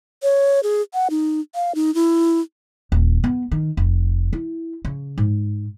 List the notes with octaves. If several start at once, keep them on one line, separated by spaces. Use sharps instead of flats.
C#5
G#4
F#5
D#4
F5
D#4
E4
D#1
B3
D#3
F1
E4
C#3
G#2